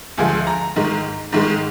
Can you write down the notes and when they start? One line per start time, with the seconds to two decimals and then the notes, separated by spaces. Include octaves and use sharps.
0.18 D2 D3 F3 G#3 G#5
0.47 A#5
0.76 G#2 D#3 G#3
1.33 G#2 D#3 G#3